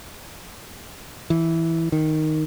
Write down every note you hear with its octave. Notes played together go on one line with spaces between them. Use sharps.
E3
D#3